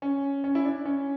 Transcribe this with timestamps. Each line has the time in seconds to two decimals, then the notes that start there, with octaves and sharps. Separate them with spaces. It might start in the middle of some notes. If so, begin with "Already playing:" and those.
0.02 C#4
0.44 C#4
0.55 E4
0.65 D4
0.86 C#4